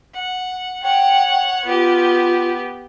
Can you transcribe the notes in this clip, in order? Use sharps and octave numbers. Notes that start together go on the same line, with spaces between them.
F#5
C#5 F#5 G5
B3 F4 G4